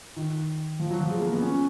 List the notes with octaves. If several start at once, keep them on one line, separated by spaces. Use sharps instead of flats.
D#3
F3
F#3
F3
G#3
A#3
B3
C#4